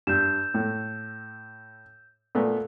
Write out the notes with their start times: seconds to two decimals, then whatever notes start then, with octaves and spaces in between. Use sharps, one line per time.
0.07 G2 E6 G6 E7
0.54 A2
2.35 A#2 A3 B3